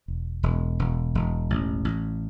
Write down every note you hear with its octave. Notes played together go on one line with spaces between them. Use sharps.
E1
E1
E1
E1
A1
A1